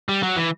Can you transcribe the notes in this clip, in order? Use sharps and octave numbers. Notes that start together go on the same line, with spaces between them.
G3
F#3
E3